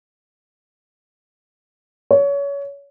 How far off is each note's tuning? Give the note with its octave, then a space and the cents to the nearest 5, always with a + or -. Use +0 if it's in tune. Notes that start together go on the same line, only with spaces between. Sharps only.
C#5 +25